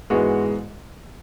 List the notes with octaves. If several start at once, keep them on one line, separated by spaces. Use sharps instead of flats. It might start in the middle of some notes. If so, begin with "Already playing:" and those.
G#2 E3 G#3 B3 F#4